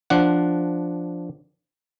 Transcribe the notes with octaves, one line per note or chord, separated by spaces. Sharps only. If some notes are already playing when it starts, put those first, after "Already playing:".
F3 D4 F#5